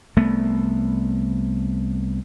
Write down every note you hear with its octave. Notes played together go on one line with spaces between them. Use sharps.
C2 A3 B3